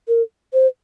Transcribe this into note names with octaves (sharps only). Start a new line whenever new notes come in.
A#4
C5